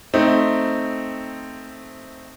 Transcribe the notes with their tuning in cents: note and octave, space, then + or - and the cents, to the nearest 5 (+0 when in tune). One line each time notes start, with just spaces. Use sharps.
A3 +0 C4 +0 D#4 +0